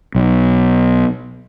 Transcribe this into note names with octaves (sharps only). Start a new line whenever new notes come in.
B1